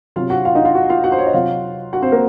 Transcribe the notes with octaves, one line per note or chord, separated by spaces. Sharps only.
C3 F#3 F4 F5
F#4 F#5
F4 F5
D#4 D#5
F4 F5
F#4 F#5
F4 F5
F#4 F#5
C5
C#5
D#5
C3 F#3 F4 F5
F#4 F#5
C4 C5
A#3 A#4